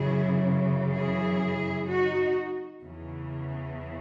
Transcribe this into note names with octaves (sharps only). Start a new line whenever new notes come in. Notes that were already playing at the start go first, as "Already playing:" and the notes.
Already playing: F#2 C#3 E3 E4 G#4
E4 G#4
D#4 F#4
E2 C#3 E3